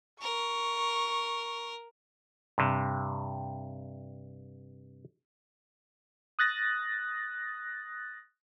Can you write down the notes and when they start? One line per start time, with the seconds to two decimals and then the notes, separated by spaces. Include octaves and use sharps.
0.23 A#4 C#6
2.58 G2 C3
6.39 D#6 F#6 A6 A#6